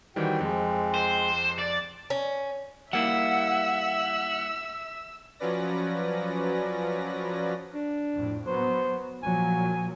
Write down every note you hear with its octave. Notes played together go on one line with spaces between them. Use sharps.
D#3 E3 G3 C4 F#4 G5
F2 F3 G#3
C5
D5
C#4
G3 A#3 E4 E5 F#5 E6
F3 F#3 C#4 B4 D5 A#6
D4
F2 A2
F#3 B3 C5
A#2 F3 F#3 G#5